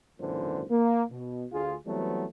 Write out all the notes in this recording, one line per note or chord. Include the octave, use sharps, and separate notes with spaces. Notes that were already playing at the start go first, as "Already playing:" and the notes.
G#1 F#2 A#2 D3 E3 C5
A#3
B2
D2 F4 G#4
E3 F#3 G3 A3 B3 C4